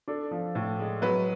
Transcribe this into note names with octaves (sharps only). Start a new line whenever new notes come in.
D4 A4
F3
A2
G#3
F#3 B4